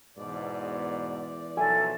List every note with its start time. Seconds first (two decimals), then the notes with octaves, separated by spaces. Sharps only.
0.17 E2 G#2 B2 D5
1.57 B1 F3 E4 A4 G#5